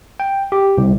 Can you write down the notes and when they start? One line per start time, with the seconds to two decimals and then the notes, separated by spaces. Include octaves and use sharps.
0.20 G5
0.52 G4
0.78 C2